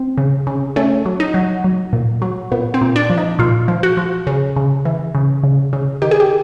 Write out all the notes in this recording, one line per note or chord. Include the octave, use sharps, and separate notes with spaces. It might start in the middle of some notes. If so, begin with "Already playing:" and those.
Already playing: C4
C#3
C#3
A3 C#4
F#3
D#4
F#3
F#3
A#2
F#3
A#2 B3
C4
A#2
D4
F3
D#4
A#2 F4
F3
F#4
F3
C#3
C#3
E3
C#3
C#3
C#3
D#3 G4
G#4
G4